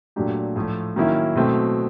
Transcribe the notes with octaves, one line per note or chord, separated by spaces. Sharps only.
A#2 F#3 A3 D4 G4
A2 F3 A3
D#3 F#3 A#3 C#4 E4
B2 F#3 A3 C4